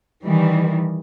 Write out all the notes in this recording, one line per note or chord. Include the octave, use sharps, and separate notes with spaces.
D#3 E3 G3